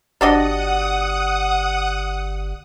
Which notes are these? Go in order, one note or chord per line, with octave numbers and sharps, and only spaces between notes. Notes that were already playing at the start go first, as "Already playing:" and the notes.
G1 D4 F#4 G4 D5 D#5 F#5 D#6